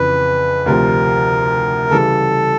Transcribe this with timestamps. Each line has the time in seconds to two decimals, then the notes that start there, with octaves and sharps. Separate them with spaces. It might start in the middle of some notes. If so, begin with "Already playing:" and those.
Already playing: F2 C#3 E3 B4
0.66 D2 C3 F3 A#4
1.91 C#3 E3 G3 A4